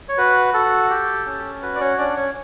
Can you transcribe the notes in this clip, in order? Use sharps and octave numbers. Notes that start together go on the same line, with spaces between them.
C#5
F#4 B4
F#4 A4
G4
C#4
F#4 B4
D5
C#4 C#5
C#4 D4 D5
C#4 C#5